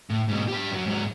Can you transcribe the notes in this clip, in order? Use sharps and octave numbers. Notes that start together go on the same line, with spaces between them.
A2
G#2 B2
G4 B4
F#2 F#3
G#2 F#3